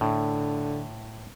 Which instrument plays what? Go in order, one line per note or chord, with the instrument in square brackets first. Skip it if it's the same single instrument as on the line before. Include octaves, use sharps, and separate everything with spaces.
[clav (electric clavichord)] A2 [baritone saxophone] D3